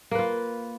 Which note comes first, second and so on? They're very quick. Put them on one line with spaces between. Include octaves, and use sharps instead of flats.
A#3 B4 F4